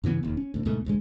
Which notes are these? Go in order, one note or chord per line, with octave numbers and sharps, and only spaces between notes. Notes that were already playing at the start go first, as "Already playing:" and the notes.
G2 C#3 E3 B3
F1 D#2
C#4
D2 A2
D2 G#2 B2 A3
E1 D2 G#2 G#3